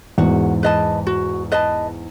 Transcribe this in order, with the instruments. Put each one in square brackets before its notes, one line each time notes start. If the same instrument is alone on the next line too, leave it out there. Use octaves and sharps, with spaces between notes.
[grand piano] E2 G#2 [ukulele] F#4
[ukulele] B4 D#5 A5
F#4
B4 D#5 A5